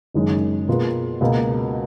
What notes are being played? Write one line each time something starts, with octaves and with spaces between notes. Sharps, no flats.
F#1 F#2 D#3 G#3
B2 A#3 F4 G#4 B4
C#2 B2 A#3